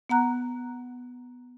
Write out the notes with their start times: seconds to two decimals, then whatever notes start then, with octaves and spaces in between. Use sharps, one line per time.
0.09 B3 F#5 A#5 F#6